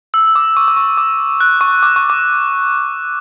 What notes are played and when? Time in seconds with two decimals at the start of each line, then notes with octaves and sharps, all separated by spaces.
0.14 E6
0.27 E6
0.36 D6
0.57 C#6
0.68 D6
0.76 C#6
0.97 D6
1.41 F#6
1.61 C#6
1.83 D6
1.96 C#6
2.10 D6